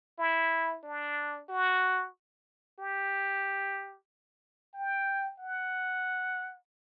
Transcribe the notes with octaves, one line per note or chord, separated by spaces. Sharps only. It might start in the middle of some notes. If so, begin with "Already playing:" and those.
E4
D4
F#4
G4
G5
F#5